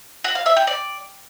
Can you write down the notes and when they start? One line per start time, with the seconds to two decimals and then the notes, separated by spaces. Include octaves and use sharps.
0.24 F#4
0.35 F5
0.46 E5
0.57 G5
0.67 D5